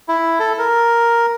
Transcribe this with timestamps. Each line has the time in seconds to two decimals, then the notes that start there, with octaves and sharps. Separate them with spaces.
0.08 E4
0.40 A4
0.59 A#4